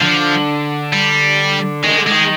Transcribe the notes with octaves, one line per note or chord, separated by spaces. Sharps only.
D3 F3
G3
D#3 G#3
D3
D#3 G#3